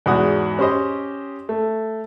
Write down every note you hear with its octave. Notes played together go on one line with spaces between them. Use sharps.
E2 G#2 F#4 D#6
C#4 G4 C5 D#5
A3